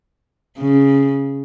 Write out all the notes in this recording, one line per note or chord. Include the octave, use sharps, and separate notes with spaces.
C#3